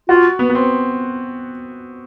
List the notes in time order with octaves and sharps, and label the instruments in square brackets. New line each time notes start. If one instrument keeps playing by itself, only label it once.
[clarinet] F4 [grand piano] F#4
[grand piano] B3
B3
C4